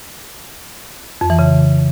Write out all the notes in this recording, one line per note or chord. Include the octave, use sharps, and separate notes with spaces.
F2
E3
C#3